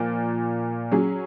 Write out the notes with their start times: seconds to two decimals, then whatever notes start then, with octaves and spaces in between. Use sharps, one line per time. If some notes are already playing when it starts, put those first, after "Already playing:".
Already playing: A#2 F3 A#3
0.92 F#3 C#4 G#4